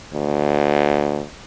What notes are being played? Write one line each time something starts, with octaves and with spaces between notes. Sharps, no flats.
D2